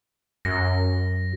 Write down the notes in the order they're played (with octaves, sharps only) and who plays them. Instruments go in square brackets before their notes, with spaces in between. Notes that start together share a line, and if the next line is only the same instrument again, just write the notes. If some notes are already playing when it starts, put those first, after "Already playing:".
[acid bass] F#2 [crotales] A#6